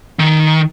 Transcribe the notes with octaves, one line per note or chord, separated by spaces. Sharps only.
D#3